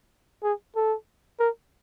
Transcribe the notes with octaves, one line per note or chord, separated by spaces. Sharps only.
G#4
A4
A#4